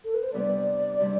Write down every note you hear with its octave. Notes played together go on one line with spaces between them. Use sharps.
A4
B4
C5
C3 G3 B3 D4 D5
C3 G3 D4